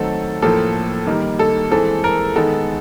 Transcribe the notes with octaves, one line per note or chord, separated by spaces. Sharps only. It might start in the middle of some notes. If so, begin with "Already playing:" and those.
Already playing: D#3 F#3 A3 C4 A4
A2 F3 A#3 A4
D#3 G3 A#3
A4
E3 G#3 C4 A4
A#4
D#3 G#3 B3 A4